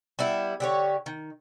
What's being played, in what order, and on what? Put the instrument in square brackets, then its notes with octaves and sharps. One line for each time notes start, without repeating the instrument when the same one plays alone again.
[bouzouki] G3 B3 E4
D3 G4 C#5
D#3